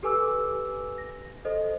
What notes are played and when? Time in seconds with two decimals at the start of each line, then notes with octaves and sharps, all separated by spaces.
0.03 G4 A4 B4 G#5 D6 E6
0.98 A#6
1.45 A4 C5 D#5